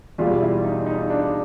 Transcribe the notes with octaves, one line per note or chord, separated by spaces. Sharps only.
E2 B2 G3 F4
E4
D#4
D#4
D4